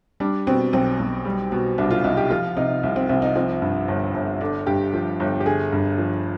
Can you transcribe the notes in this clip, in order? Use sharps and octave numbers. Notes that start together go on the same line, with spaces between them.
G3 D4
B2 C4
B1 C4
B1
G3
B2
C2 D4
F4
C2 D#4
G4
F3 F4
C3 D#4
C2
C4
C2 C4
D#4
F3 C4
G2
G1
G1
D3 D4
G2 G4
F3
G1
G4
D3 G#4
G2
F3